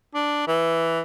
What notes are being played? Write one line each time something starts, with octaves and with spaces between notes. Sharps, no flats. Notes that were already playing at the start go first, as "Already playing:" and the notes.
D4
E3